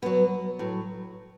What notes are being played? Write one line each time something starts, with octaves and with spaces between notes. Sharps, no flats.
B2 F#3 B3
A2 F#3